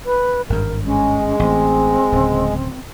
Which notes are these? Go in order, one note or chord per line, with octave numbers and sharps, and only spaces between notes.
B4
G#1 G2 A#4
G#3 C#4
A1 C4
D1 C#3